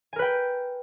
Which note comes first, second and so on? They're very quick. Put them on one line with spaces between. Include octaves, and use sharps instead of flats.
G#5 A#4 B4 G5